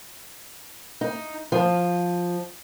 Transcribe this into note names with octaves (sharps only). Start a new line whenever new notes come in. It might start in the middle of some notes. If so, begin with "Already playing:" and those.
D#4
F3